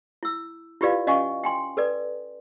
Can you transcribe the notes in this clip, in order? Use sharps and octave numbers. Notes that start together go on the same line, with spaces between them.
E4 E6
E4 F4 G4 B4 D5 F5
C#4 D#5 F5 F#5 G#5 C#6
G5 G#5 C6
A4 B4 D5